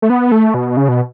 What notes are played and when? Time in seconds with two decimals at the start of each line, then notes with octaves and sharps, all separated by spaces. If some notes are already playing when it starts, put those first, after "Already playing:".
0.02 A3
0.10 B3
0.32 A3
0.54 B2
0.77 C#3
0.88 B2